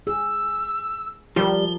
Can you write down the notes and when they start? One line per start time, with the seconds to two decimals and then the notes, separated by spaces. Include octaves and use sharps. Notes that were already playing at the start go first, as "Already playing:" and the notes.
0.07 G#4 E6
1.36 F3 G3 G4 A#4 G7